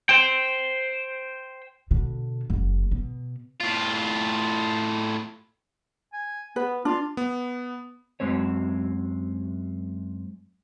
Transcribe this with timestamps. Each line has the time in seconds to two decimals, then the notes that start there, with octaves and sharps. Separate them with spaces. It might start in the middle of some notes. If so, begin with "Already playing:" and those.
0.09 C5 G5
1.91 B2 D3
2.50 F#1
2.91 B2
3.61 A2 F4
6.13 G#5
6.56 B3 B4
6.85 D4 F4
7.17 B3
8.20 F#2 G#3 C4 C#5